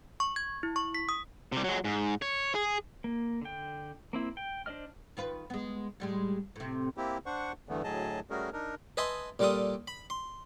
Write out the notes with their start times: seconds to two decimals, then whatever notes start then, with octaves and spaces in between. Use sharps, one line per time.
0.20 C#6
0.36 G#6
0.63 E4
0.76 C#6
0.95 B6
1.09 D#6
1.52 C3 G3
1.64 F#3 G#3
1.84 G#2
2.22 C#5
2.55 G#4
3.04 A#3
3.41 D3 G5
4.13 A#3 C4 E4
4.37 G5
4.66 D4 C5 D5 D#5 F6
5.17 D#3 F4 B4
5.50 G#3 B3
6.00 A2 G3 G#3
6.56 A2 C3
6.97 A#3 C4 E4 G4
7.26 D4 C5 F#5 C#6
7.69 E2 G2 D3 E3 A3 B3
7.84 D2 A2 F#3 G#4 D#5 A5
8.30 G3 A3 C#4 F#4 G#4 A#4
8.53 D4 D#4 A#4
8.97 B4 D#5 E5 G#5 A5 C6
9.39 A#2 G3 F4 A4 D#6
9.88 B5
10.10 C6